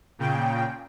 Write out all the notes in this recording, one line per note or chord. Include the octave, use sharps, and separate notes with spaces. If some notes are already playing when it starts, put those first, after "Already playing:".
A#2 C#3 G5